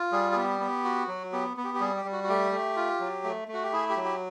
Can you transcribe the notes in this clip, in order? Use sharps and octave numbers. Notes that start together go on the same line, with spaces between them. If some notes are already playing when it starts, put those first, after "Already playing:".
Already playing: F4
G3 G#4
G#4
B3 G4
B3
F#4
F#3
B3 G4
B3
G4
G4
G3 G#4
G4
G3
F#4
F#4
A3 G4
A3
F4
F#3
A3
A3
F#4
G4
E4 G#4
G4
F#3
G4